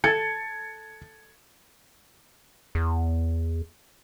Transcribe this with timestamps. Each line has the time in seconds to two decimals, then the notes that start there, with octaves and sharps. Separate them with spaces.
0.04 A4 G#6 A6 C#7
2.75 E2